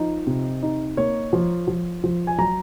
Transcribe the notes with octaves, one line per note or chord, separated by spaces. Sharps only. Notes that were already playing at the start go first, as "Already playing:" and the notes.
Already playing: F3 D#4
C3
D#4
A#3 C#5
F3
F3
F3
G#5
F#3 A#5